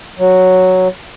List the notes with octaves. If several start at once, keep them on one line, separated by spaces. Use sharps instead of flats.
F#3